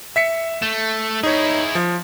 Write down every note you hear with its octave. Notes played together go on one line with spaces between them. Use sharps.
E5 B6 C#7
A3 E7
D#4 E4 G#4 C#5
F3